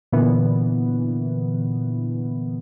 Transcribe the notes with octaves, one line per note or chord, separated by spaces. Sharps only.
A#2 D3 E3 B3